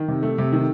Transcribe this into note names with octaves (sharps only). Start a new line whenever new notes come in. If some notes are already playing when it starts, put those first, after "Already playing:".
Already playing: D#3
C3
A3
C3
D#3